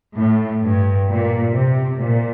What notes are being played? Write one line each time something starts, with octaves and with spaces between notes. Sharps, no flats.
A2
G2
A#2
C3
A#2